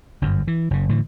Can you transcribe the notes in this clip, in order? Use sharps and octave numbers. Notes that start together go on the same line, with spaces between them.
G1 F#2
E3
F#1 C#3
A2 D3 E3